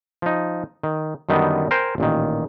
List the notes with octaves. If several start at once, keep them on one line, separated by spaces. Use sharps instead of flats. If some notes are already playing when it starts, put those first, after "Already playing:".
F3 D#4
D#3
F#2 D3 D#3 G3 B3 D#4
A#4 C5 G5 G#5
A1 A#2 D#3